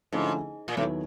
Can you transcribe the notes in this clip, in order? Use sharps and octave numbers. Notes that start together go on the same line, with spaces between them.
G#2 D3 F3 A3 C#4 E4
A#2
D#2 A2 D#3 F#3 B3 E4